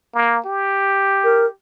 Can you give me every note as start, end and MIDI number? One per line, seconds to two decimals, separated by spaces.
0.14 0.39 58
0.46 1.52 67
1.24 1.46 70